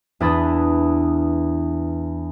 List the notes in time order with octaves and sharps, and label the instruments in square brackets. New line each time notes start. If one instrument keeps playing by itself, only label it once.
[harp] E2 D4 E4 B4 D#6 A6